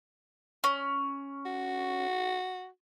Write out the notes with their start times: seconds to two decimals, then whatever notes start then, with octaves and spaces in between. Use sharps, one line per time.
0.64 C#4
1.46 F#4